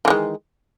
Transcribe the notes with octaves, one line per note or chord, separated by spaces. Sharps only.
D#3 E3 G#3